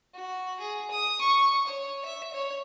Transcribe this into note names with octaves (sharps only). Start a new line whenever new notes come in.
F#4
G#4
D#6
C#6
C#5
E5
C#5